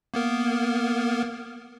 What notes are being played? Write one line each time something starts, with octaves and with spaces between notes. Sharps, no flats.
A#3 B3 A#4